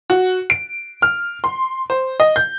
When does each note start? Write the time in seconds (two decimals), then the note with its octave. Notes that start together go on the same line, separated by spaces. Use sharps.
0.10 F#4
0.50 D7
1.02 F6
1.44 C6
1.90 C5
2.20 D#5
2.36 G6